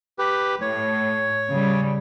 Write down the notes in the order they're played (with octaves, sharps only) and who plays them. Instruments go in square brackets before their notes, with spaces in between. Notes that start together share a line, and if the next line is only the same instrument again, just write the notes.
[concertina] G4 B4
[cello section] A2 [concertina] C#5
[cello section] C#3 G3